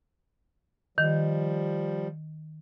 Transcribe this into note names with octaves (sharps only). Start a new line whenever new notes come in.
D#3 F3 G3